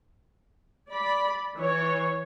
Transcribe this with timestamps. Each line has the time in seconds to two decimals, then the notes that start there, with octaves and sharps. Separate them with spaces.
0.89 D5 B5
1.57 E3 C#5